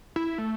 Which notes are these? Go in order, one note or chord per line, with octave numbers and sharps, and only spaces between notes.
E4
A3